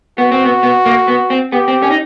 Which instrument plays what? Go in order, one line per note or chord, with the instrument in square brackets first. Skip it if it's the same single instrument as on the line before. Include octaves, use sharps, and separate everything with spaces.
[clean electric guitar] B3 [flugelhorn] F#4
[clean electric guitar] C4
B3
B3
A#3
B3
C4
[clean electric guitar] B3 [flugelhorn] G4
[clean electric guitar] C4
C#4
D#4